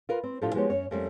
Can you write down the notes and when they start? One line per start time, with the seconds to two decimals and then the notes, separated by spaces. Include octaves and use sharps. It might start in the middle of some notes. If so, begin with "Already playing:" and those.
0.09 F4 A#4 B4
0.23 C4
0.42 A2 F3 D4 F4 G4 A4
0.54 F3 G#3 B3 F#4 G4 C#5
0.70 F#2 C#4 C#5
0.91 F2 G3 A3 A#3 C#4